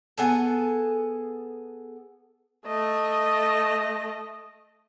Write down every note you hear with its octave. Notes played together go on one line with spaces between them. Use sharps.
B3 G#4 A4
A3 D#5